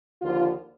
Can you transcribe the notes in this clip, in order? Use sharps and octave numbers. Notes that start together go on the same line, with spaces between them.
D#2 D3 F3 F4